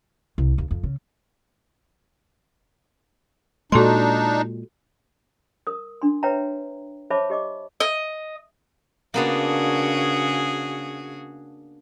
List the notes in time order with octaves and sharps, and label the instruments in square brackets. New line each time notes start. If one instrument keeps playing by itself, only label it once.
[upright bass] C2
D#2
F2
C#3
[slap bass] A#2 G#3 [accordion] D4 D#4 [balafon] F#4 A4 C6
[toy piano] A#4 D#6
D4 C6
B4 C#5 E5 G5 A#5
C5 C#5 E5 A5 B5 D6
G4 D#5 D6
[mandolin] D#5
[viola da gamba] C#3 F#4 G#4 [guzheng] A#3 B3 D4